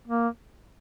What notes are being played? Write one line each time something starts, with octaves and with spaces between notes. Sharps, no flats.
A#3